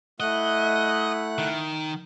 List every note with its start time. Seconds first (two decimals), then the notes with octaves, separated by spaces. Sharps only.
0.20 A3 E4 D#5 F#5 F#6
1.38 D#3